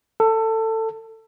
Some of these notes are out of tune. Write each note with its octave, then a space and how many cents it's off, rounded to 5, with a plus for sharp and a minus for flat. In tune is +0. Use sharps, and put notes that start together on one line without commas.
A4 +20